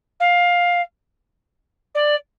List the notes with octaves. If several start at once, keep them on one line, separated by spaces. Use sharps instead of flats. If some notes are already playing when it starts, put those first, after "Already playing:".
F5
D5